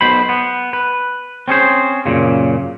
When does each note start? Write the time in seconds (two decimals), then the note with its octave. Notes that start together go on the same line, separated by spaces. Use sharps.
0.01 B1 B2 C5 B5
0.29 B3
0.73 B4
1.48 C4 C#4 G#4 C5
2.06 F#2 A#2 C#3